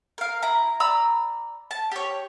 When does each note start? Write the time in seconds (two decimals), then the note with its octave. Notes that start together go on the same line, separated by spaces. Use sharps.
0.18 A#4 F5
0.43 E4 A#5
0.80 D5 A#5 B5 E6
1.71 A5
1.92 G4 C#5